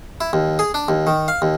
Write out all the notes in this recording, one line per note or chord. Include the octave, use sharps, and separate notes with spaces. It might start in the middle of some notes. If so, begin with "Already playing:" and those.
E4
D#2
G#4
D4
D#2
D#3
F5
D#2